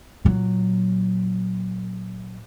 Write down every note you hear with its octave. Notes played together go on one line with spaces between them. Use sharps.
A#2 F#3